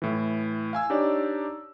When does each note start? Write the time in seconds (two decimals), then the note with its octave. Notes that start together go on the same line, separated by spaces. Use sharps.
0.02 A2 E3
0.73 F5 G#5 E6
0.90 D4 D#4 G4 C#5 D5